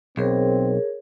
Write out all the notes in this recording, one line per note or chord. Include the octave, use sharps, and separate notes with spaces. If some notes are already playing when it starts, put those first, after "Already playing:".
B1 C4 G#4 A#4 C#5